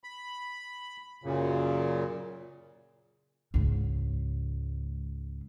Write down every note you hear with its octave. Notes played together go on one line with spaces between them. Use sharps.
B5
F#2 A#2 C#3
C#2 G#2